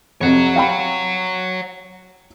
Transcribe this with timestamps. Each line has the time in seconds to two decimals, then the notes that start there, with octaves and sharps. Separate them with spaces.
0.21 F2 C3 C#5 F#5
0.56 F5 G5 B5